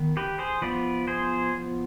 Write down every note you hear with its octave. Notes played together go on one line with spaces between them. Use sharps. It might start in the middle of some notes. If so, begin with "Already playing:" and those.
Already playing: D#3 B3
G4 B4
G#4 C5
F3 B3 B4 D5
G#4 C5